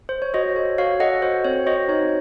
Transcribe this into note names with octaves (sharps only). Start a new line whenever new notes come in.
C5
C#5
F#4 C5 D#5
A4 C#5
F#4 C#5 F5
A4 D#5 F#5
F#4 C5
C4 C#5
F#4 C5 D#5
D#4 C#5